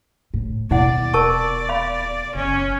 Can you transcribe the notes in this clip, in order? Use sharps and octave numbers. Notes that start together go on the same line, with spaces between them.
A2
D#2 B2 E4 D5 F#5
D#1 A#4 A5 C#6
F5 B5
F#1 C#4